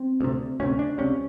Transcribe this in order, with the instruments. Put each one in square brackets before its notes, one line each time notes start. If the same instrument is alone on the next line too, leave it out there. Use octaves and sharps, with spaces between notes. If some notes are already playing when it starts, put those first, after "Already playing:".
Already playing: [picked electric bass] C4
D2 C3
D2 C3 C#4
D4
C#2 C3 C#4